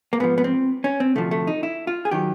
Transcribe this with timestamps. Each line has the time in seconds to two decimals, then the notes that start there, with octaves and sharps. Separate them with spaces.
0.13 A#3
0.20 G#2 F3 B3
0.38 B3
0.44 C4
0.84 C#4
1.00 C4
1.16 D2 C3 F3 A3
1.31 A3
1.47 D#4
1.63 E4
1.87 F4
2.05 G#4
2.11 D#3 F#3 G4